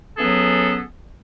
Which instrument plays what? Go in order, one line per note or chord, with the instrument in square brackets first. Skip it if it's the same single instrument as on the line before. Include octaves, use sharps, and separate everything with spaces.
[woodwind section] E3 F#3 B3 C#4 G#4 A4